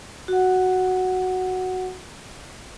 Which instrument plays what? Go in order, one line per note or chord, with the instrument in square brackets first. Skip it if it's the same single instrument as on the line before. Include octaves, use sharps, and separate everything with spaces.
[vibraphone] F#4 F#5